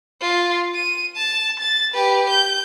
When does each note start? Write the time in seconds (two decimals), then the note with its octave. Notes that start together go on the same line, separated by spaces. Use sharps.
0.21 F4
0.74 D#7
1.16 A5
1.59 A6
1.94 G4 B4
2.29 G6